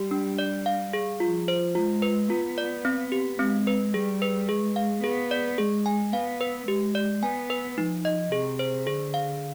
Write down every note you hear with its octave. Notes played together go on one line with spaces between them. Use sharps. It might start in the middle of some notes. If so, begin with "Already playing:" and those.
Already playing: G3 G4
D4
D5
F5
G#4
F3 F4
C5
G#3 F4
B4
B3 F4
D5
C4
G4
G#3 C4
B4
G3 G#4
B4
G#3 G#4
F5
B3 G#4
D5
G#3 G#4
G#5
B3 F5
B4
G#3 G4
D5
B3 G#5
B4
F3 D#4
D#5
C3 G#4
C5
D3 G#4
F5